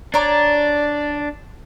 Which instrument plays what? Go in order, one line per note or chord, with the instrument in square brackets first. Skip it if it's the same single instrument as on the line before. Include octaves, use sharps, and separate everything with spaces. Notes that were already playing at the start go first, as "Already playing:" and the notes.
[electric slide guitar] D4 [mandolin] C#5 A#5 D6 [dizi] D5